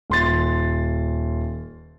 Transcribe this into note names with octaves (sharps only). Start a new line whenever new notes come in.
D#1 C6 A6